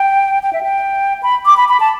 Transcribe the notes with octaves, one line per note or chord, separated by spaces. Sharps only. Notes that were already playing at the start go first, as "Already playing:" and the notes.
Already playing: G5
G5
E5
G5
B5
D6
B5
B5
A5